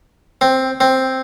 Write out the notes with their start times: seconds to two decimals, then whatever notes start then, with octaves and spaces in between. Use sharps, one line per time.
0.41 C4
0.81 C4